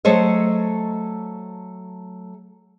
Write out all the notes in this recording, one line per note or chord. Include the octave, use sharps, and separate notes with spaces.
F#3 A3 A4 C5 C#5 D#5